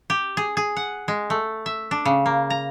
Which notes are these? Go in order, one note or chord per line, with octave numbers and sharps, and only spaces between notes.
G4
G#4
G#4
F#5
G#3
A3
E5
D4
C#3
A#3
A#5